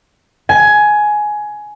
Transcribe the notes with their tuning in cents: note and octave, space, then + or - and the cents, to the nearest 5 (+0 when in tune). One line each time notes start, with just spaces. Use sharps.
G#5 +15